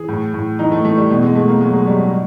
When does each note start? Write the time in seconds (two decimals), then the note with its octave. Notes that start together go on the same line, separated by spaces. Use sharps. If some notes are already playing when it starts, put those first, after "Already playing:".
Already playing: E3 G#4
0.08 A2
0.34 A2
0.59 E3 D#4
0.72 A3
0.85 E3 A3
0.97 G3
1.10 B2
1.22 G#3
1.35 B2 A3
1.48 A#3
1.61 F#3 G#3
1.73 G#3
1.86 F#3 G3
1.99 G#3